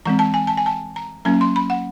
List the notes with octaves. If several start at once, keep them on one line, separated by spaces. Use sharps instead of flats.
E3 G#3 C4 A#5
A5
G#5
A5
G#5
A5
A#5
F#3 A#3 C#4 A#5
C6
B5
F#5